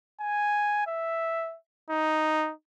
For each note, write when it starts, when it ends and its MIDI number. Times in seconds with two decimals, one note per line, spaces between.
0.21 0.83 80
0.87 1.56 76
1.90 2.52 63